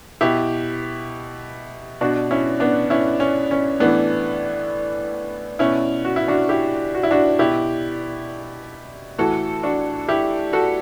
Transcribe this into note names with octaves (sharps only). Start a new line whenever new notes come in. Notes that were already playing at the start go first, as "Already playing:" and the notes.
B2 E4 G4
B2 D4 F#4
C#4 E4
B3 D4
C#4 E4
C#4
C#4
A2 E3 B3 D4
B2 C#4 E4
F#4
E4
D4 F#4
E4 G4
F#4
E4
D4 F#4
B2 E4 G4
A2 E3 F#4 A4
D4 F#4
E4 G4
F#4 A4